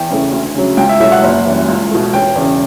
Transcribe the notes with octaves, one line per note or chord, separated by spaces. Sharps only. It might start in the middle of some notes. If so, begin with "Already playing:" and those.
Already playing: E2 G5
C#3 E3 A3
D2
C#3 F#3
C#2 G5
E5
B2 F#3 A3 E5
F#5
F#1
F#2 E3 G3
C#2
B2 A3
E1 G5
E2 C#3